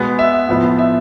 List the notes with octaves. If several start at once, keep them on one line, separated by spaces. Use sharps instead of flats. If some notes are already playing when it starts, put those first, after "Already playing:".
Already playing: B2 G#3 B3
E5
A2 F3 B3
E5